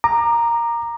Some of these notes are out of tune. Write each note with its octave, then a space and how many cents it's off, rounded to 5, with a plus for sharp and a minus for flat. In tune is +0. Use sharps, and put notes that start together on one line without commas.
A#5 +0 D6 +35